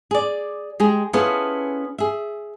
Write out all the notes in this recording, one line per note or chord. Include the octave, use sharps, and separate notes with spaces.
G#4 D5
G#3 G4 G#4
B3 C#4 E4 F4 G#4 A4
G#4 E5